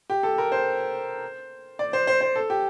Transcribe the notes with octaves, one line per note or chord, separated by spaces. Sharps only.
G4
A4
A#4
C5
D5
C5
C5
C5
A4
G4